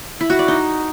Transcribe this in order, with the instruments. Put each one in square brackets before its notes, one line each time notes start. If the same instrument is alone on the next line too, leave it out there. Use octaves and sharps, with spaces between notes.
[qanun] E4
F#4
D5
D#4